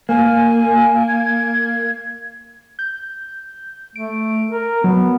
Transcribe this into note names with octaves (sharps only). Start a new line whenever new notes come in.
A#3 G#5
G#6
G6
A3 D7
A#4
F#3 B3